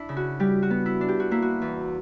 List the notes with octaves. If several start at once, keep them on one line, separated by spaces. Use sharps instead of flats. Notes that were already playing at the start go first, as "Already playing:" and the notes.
Already playing: D4 E4
C#3
F#4
G3 G4
F#4
B3
E4
D4
G4
F#4
A#3 E4
F#4
E2